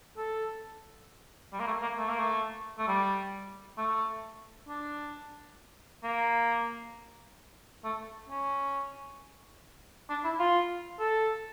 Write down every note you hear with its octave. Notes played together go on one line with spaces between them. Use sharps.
A4
G3
A#3
A3
A#3
A3
A#3
A3
A3
G3
A3
D4
A#3
A3
C#4
D4
E4
F4
A4